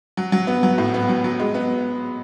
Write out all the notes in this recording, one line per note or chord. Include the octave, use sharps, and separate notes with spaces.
F#3
F#3
B3
F#3
A2
B3
F#3
F#3
G#3
B3